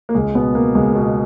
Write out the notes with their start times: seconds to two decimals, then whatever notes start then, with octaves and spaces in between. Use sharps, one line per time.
0.09 A#3
0.15 C#2 G#3
0.35 B2 B3
0.55 B2 A#3
0.75 C#2 G#3
0.95 B2